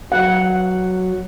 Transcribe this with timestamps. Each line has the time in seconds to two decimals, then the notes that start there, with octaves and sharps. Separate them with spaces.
0.12 F#3 F#5